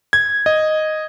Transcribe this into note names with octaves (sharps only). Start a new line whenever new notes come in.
G#6
D#5